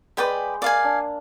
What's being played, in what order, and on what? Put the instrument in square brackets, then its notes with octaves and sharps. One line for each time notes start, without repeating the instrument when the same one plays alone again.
[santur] G#3 [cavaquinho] B4 D5 G5 B5
[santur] A#3 [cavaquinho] D5 F5 G#5
[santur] D4